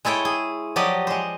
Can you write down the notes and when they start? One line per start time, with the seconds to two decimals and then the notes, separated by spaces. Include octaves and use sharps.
0.05 G#3 E4 A4 C#5 G5
0.25 G#4
0.76 F3 F#3 G4 D5 D#5
1.07 G#3 C5